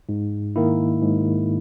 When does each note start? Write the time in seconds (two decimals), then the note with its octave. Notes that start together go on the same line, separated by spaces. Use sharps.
0.09 G#2
0.56 D#3 A#3 E4
1.02 G#2